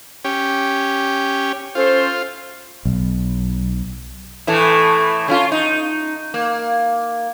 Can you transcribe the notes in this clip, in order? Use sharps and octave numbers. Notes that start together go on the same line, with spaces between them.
C#4 G4
C#4 F4 A4 C5
B1
A2 E3 A3
D3 C#4 F4
D#4
A#3